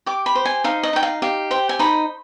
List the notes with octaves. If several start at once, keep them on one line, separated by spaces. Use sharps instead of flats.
G4 D6
B5
C5
G#5
D#4 F5
D#5
D#4 G5
F5
G4 F5
C5 G5
G#5
D#4 B5